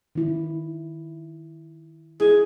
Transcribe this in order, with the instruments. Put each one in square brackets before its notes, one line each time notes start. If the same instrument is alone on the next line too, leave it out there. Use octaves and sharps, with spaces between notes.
[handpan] D#3 E4
[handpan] E4 [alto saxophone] G#4